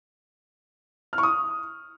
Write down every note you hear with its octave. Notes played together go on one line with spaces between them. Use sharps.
F6
C#6
D#6